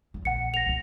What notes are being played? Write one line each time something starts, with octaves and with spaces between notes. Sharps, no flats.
E2 F3
A#1 F#5 C#7
A#6 F7
B1 F3